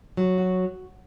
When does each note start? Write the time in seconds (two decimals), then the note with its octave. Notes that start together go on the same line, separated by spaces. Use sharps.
0.17 F#3
0.38 F#4